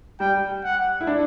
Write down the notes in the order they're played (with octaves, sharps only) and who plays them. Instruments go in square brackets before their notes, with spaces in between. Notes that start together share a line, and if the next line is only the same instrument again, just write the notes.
[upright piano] G3 [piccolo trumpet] G5
[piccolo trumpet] F#5
[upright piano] E4
D4